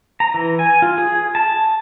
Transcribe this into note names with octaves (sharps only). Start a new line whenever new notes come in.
A#5
E3
G#5
F4
G#4
A5